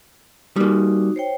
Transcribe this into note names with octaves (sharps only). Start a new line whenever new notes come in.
G3 A#3 D#4 F#4
C5 C#5 G5